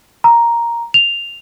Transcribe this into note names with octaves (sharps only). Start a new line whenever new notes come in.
A#5
F7